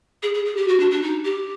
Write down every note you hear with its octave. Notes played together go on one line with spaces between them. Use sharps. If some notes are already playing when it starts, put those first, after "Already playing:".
G#4
G#4
G#4
G4
F#4
D4
D4
D#4
G4